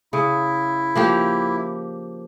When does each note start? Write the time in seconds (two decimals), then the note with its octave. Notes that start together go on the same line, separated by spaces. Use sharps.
0.13 C#3 E4
0.96 F3 A#3 G4